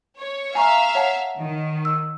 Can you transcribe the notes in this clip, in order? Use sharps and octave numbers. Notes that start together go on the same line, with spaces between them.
C#5
E5 F5 G#5 A#5 C#6
C#5 F#5 A5
D#3
E6